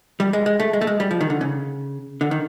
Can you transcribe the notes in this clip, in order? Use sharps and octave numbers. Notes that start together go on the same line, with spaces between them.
G3
G#3
G#3
A3
G#3
A3
G#3
G3
F3
D#3
D3
C#3
D3
D#3